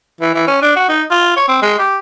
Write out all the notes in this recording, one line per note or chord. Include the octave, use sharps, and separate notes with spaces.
E3
E3
C#4
D4
F#4
D#4
F4
C#5
C4
G#3
G4